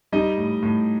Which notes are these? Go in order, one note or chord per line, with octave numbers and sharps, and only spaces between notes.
G3 D#4 D#5
A2
A2